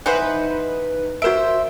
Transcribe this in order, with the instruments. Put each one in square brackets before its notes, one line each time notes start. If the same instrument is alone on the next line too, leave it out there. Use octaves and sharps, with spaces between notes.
[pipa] E3 C5 [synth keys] D#4 B4 [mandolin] F#5
[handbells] F#4 A#4 D7 [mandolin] C5 E5